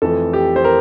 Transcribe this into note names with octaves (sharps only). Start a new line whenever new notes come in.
F2 E3 A3 A4
G4
C5
A#4